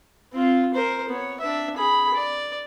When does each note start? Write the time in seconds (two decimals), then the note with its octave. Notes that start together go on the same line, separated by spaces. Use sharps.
0.33 C4 F4
0.74 A#4 C5
1.09 B3 C#5
1.40 D4 E5
1.77 G#4 B5
2.14 D5